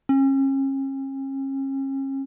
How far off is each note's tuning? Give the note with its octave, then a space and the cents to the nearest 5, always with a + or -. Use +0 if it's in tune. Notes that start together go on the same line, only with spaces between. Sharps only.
C#4 -40